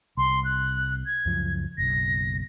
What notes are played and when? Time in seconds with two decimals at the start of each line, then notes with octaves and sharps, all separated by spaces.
0.17 C2 C6
0.44 F#6
1.06 G#6
1.25 C#2 F#2 F3
1.78 F#1 B1 A#6